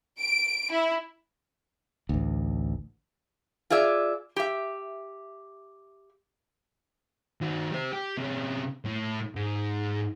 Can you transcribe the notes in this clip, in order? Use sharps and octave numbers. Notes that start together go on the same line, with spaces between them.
D7
E4
A1 D2
F4 G#4 D5 E5
G4 E5
D#3 F#4
G4 C5
G4
C3 C#4
A2
G#2